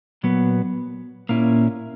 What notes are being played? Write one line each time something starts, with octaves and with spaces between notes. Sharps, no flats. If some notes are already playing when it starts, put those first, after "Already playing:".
A#2 F#3 B3
A#2 A#3 C#4 E4